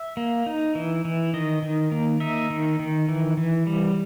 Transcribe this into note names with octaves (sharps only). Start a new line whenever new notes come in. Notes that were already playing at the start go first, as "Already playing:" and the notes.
Already playing: E5
A#3
D#4
E3
E3
D#3 D#5
D#3
A#3
D#4 E5
D#3
D#3
E3
E3
G3